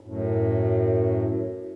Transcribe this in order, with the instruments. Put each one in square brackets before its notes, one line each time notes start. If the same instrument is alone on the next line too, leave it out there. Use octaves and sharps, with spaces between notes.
[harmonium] F#2 A2